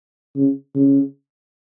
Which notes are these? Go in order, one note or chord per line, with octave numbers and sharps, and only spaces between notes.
C#3
C#3